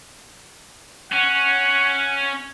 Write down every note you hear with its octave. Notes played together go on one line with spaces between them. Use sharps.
C#4 F#5